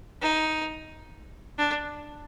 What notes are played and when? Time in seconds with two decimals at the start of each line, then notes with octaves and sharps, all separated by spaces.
0.22 D#4
1.59 D4